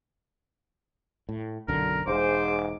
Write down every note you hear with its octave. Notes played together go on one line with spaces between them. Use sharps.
A2
B1 F#2 D3 A#4
E1 G#2 G#4 C5 D6